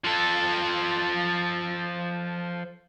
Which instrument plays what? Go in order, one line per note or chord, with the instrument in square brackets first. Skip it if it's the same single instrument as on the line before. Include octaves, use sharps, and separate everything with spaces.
[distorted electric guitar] F3 A4